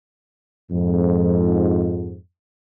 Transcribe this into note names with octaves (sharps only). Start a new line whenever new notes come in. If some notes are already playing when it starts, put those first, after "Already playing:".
F2 G#2